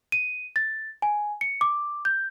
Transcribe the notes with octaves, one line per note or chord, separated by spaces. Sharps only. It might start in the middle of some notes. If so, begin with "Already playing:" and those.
D#7
A6
G#5
C#7
D6
G6